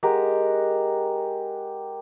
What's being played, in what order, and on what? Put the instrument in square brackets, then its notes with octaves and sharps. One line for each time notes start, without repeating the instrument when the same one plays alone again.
[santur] G#3 G4 A#4 F#5